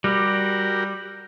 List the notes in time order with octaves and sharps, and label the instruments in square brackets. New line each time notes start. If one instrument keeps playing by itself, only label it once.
[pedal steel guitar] G3 [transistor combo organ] F#4 G4 A#4